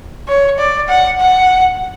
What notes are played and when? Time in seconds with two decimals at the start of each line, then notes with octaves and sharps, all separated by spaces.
0.28 C#5
0.58 D5
0.88 F#5
1.20 F#5